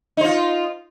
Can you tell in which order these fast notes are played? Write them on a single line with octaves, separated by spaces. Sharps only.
D#4 C5 F4